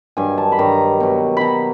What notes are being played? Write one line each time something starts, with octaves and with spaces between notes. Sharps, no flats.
G2 D#3 F#3 G#5
A5
B5
G2 D#3 F#3 A#5
B2 F#3
B2 F#3 A#5 B5